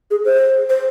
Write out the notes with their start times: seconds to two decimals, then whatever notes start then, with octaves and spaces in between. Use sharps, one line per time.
0.11 G#4
0.25 C5
0.70 C5